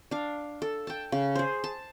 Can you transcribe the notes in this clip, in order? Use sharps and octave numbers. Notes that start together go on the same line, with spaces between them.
D4 F5
A4
G5 A5
C#3
G#4 C5
A5